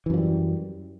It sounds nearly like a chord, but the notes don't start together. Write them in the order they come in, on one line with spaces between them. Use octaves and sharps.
E3 F#2 F3 G3